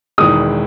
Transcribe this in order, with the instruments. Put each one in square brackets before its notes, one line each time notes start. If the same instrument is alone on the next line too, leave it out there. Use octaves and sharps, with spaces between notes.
[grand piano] E1 E2 D#3 G#3 D#6